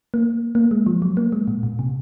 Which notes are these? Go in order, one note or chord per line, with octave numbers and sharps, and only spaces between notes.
A#3
A#3
G#3
F3
F#3
A#3
G#3
A#2
A#2
C3